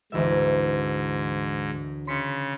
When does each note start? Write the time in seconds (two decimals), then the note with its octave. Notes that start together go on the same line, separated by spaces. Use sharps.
0.12 D2 G#2 E3 E5
2.07 C#3 C6 B6 C#7